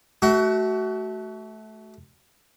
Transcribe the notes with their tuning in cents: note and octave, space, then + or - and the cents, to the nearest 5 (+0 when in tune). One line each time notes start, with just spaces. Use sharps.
A3 -20 F#4 +20